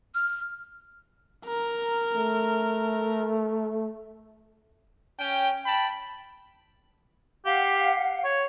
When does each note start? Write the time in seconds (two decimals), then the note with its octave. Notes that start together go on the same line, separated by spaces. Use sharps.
0.14 F6
1.46 A#4
2.15 A3
5.20 C#4 G5
5.65 G5 A5 B5
7.46 G4 F5 F#5
8.24 C#5